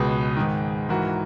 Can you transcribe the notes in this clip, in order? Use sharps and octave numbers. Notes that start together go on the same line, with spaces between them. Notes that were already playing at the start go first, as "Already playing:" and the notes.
Already playing: C#2 B2 G#4 B4
G#2 D#3
G#2 E3 F#4 A#4